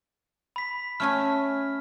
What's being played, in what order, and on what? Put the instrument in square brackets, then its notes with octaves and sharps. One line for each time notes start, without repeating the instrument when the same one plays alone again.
[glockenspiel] B5 B6
[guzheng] A3 C#4 G#5 [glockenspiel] F6